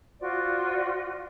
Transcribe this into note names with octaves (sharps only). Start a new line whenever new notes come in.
F4 F#4 C5 D5